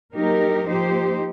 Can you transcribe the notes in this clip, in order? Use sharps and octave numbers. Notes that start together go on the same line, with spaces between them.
F#3 A#3 D#4 G4 A#4
F3 A#3 D#4 G4 C5